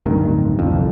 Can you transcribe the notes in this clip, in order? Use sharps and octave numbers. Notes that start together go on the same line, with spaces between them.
D1 D2 G2 D#3
C2 F2